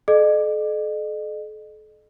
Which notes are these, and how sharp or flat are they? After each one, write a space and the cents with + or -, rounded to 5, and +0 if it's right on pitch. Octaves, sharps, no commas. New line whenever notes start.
A4 -40 D#5 -40